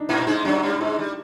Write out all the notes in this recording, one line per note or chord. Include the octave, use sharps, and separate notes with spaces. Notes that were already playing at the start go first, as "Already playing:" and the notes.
Already playing: D4 D#4
A#2 A#3 E4
G#2 G#3 D#4
F#2 F#3 D4
G2 G3
G#2 G#3 D#4
G3